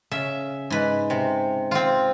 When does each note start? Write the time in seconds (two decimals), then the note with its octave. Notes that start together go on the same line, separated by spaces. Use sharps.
0.11 C#3 E5
0.70 G#2 B4
1.10 C3
1.71 C4 F4